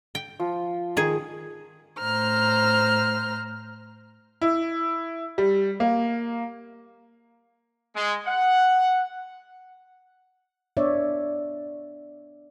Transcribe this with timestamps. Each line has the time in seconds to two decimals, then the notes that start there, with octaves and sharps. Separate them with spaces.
0.15 G5
0.40 F3
0.97 D#3 G#4
2.01 A2 C5 A#5 F6
4.41 E4
5.38 G3
5.80 A#3
7.96 G#3
8.26 F#5
10.77 B3 D4 C#5 D5 E5